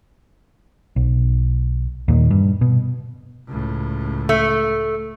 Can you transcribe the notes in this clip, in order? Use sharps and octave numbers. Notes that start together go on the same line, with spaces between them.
B1
D#2 A#2
G2
B2
C#2 A2
A3